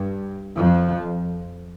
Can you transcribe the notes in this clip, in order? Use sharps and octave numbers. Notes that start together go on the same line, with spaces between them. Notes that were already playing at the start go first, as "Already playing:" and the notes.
Already playing: G2
F2 F3